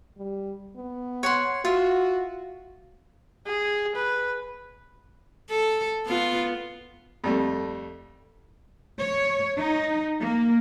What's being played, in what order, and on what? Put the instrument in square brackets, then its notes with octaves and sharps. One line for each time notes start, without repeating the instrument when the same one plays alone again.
[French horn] G3
B3
[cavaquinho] C#5 F#5 C6
[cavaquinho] F4 E5 [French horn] F#4
[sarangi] G#4
B4
[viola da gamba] A4
B3 F4
[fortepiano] F2 G3 A3
[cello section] C#5
D#4
A#3